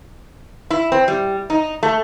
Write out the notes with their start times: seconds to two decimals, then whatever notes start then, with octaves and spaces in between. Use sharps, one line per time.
0.70 E4
0.92 C4
1.08 G3
1.50 D#4
1.83 A3